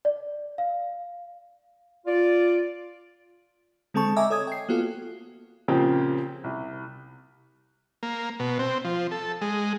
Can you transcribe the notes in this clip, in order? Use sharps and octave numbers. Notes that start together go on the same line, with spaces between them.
D5
F5
F4 D5
D3 G#3 C4 A4 A5 C#6
D#5 E5 G#5 A#5 D6
A4 C#5 D#6 G#6
G5 C7
A#3 B3 F4 F#4 A4
A#2 C#3 F3 A#3 C4 G4
C2
A#3
B2
C4
F3
A4
G#3